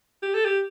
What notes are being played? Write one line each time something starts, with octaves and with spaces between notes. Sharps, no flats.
G4
A4
G4